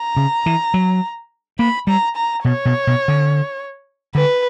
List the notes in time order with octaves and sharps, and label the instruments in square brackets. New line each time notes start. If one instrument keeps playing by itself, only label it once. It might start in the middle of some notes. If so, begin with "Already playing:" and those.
Already playing: [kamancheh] A#5
[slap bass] C#3
E3
F#3
[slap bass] A#3 [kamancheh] B5
[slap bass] G3 [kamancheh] A#5
[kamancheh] A#5
[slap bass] B2 [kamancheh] C#5
[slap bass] B2
B2
D3
[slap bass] D3 [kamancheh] B4